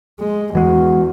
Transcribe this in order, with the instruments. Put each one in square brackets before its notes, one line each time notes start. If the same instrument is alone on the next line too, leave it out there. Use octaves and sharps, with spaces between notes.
[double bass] G#3
[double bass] E2 [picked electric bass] E3 G#3 [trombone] F#4